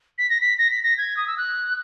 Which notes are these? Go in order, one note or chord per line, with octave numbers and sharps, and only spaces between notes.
B6
A#6
B6
A#6
B6
A#6
G#6
D#6
E6
F#6